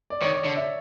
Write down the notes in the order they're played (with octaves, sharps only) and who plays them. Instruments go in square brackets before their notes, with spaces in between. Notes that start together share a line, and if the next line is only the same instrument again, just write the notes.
[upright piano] D5
[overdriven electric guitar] D#3 [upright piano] C#5
[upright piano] D5
[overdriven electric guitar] D3 [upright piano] D5
[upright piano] E5